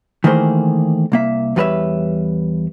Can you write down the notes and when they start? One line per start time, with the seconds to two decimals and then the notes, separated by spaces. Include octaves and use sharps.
0.24 D#3 E3 A3 A#3 G#4 C5
1.12 C2 A#3 E5
1.56 E2 G3 F4 B4 C#5 E5